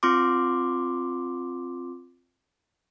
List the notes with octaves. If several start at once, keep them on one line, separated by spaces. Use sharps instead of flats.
C4 F4 C6 D6